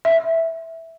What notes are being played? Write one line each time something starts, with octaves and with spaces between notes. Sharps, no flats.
E5